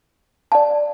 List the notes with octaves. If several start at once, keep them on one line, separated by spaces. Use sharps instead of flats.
D5 F5 A5